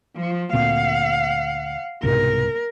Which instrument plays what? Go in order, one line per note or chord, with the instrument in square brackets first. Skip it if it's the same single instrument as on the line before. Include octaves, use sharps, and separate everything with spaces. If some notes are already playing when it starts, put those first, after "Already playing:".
[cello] F3
[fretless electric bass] D2 A#2 C4 [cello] F5 F#5
[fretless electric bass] C2 G#2 B2 [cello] A#4